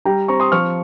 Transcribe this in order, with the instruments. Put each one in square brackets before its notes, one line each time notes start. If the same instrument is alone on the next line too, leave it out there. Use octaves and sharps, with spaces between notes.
[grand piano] G3 G5 A#5
C4 A#5 C#6
C6 D#6
F3 C#6 F6